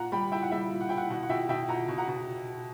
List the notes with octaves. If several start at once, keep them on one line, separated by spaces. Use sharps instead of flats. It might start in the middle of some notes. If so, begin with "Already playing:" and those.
Already playing: A#2 F#5 A#5
G3 G5 B5
E4 E5 G5
F#5
G3 E5
A#2
F#5
E4 G5
F#5
B2 F#5
F#5
B2 E5 G5
B2 E5 G5
B2 F#5 A#5
B2
F#5 A#5
B2